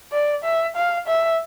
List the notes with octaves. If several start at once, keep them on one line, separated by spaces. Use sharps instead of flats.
D5
E5
F5
E5